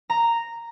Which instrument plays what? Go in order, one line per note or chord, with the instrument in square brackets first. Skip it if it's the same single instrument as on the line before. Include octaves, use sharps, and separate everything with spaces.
[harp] A#5